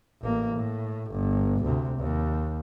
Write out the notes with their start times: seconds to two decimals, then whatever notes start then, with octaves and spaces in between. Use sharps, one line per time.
0.22 A1 A#3
0.56 A2
1.11 G1
1.63 D2 C3
1.99 D#2